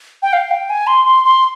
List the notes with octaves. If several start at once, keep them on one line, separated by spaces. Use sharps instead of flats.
G5
F5
G5
G#5
C6
C6
C6